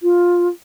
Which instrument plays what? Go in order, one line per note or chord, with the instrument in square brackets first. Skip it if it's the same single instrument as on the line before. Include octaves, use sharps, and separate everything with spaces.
[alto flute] F4